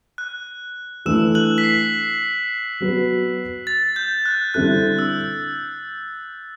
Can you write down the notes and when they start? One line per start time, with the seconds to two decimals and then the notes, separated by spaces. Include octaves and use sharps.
0.18 F#6
1.06 E3 A3 D4 E6 E7
1.35 F#6 F#7
1.58 B6
1.64 C7
2.80 F#3 B3 F#4
3.67 A6
3.96 G6
4.26 F#6
4.54 D3 G3 C4 E4 A4 F#6
4.99 E6